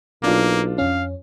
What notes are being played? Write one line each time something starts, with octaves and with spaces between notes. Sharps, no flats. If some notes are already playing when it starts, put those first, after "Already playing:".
B1 A#3 D4 F4
F2 C#4 F5